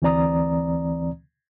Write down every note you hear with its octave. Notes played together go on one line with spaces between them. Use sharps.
D2 E3 C4 D5 A#5 D#6